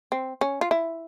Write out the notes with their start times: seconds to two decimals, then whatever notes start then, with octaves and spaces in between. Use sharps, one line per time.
0.12 C4
0.41 C#4
0.61 F4
0.71 E4